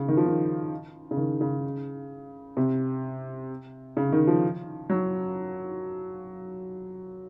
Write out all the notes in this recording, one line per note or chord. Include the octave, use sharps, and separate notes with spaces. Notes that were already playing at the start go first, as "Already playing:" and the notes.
Already playing: C#3
D#3
F3
D#3
C#3
D#3
C#3
C3
C#3
D#3
F3
F#3